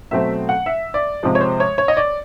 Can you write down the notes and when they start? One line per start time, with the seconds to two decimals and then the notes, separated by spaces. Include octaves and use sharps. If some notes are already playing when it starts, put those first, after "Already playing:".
0.11 B2 F#3 A3 C4 E5
0.49 F#5
0.66 E5
0.94 D5
1.23 C3 F3 G#3
1.35 C#5
1.41 C5
1.60 C#5
1.78 C#5
1.88 D#5
1.97 D5